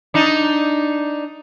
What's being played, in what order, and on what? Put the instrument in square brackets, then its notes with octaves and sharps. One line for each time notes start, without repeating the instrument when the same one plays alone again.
[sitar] D4 D#4